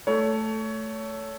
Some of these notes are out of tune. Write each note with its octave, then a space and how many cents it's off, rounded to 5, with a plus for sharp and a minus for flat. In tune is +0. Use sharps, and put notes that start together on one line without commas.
A3 +0 C#5 +20